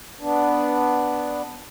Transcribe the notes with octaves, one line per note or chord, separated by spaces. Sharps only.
B3 D4